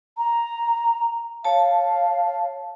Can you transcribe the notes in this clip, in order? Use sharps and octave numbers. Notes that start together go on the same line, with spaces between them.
A#5
C#5 F5 A5